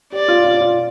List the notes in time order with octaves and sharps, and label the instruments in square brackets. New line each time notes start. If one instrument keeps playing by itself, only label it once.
[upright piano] G4 [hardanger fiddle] D5
[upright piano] F4
F4
F4